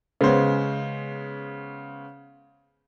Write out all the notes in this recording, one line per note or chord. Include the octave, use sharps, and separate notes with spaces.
C#3 G#3 B3 C#4 C5